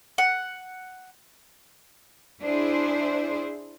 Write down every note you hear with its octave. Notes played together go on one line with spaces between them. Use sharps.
F#5
D4 E4 G#4 C5